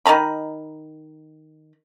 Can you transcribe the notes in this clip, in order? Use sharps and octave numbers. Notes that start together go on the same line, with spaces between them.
D#3 D#5 A#5 B5